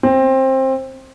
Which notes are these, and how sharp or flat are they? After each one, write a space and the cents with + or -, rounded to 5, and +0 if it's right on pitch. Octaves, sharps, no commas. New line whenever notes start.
C4 +20